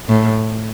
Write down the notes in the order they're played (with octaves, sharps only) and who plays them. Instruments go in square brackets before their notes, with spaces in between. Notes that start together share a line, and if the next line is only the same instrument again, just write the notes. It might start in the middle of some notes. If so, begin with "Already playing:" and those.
[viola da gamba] A2